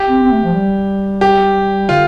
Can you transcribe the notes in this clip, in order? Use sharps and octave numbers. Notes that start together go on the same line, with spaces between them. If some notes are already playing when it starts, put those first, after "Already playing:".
Already playing: G4
C4
C4
A3
F3
G3
G4
D3 F4